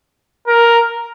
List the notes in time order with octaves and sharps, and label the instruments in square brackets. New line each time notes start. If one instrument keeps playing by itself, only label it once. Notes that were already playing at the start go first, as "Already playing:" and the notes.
[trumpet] A#4